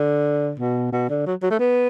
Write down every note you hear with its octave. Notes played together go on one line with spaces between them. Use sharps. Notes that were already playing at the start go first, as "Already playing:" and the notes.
Already playing: D3
B2
B2
D3
F#3
F#3
A3
B3